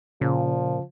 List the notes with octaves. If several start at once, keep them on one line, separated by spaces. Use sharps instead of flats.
A#2 C#3 F3